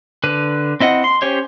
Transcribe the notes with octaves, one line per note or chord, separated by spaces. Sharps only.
D3 B4
C4 E4 D#5 F#5
C6
C#4 G4 C5 C#5